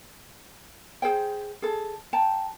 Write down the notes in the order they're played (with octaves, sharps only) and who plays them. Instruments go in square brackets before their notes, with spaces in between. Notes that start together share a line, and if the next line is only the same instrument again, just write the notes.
[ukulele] G#4 C5 G5
G#4 A4
G5 A5 A#5